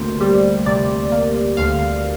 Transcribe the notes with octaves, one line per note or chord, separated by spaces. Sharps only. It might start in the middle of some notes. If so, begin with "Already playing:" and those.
Already playing: D2 C3 A#3 C5
G3
C3 D5
A#3
D2 F5